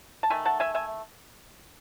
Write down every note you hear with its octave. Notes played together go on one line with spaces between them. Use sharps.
A5
D#3 A3 E5 G#5
F#5 A5
E5 G#5
E5 G#5